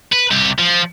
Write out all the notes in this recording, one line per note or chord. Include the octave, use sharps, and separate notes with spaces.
B4
C2 G4
F3